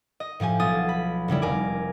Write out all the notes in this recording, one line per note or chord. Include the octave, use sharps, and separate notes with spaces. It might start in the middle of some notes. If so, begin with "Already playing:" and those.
D#5
A2 F3 G4 G#5
B1 F4 D#6 A6
B5
E1 C#3 G3 E4
F1 A#4 G#5 D6